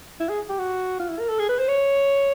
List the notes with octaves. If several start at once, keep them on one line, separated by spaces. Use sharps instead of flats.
E4
G#4
G4
F#4
F4
E4
A#4
A4
G#4
B4
C5
C#5